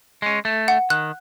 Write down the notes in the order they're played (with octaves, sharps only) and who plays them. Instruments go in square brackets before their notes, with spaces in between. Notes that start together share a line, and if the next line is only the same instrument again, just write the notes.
[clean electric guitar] G#3 C#4
A3
[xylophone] F#5
[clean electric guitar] D#3 [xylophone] F#6